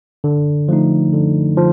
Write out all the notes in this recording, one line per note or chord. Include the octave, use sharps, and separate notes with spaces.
D3
F3 A3 D#4
D3
F3